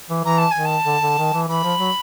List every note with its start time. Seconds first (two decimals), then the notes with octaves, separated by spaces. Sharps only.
0.10 E3
0.24 E3 A#5
0.37 A5
0.51 D#3 G#5
0.65 A5
0.86 D3
1.03 D3
1.18 D#3
1.33 E3
1.48 E3 B5
1.63 F3
1.79 F#3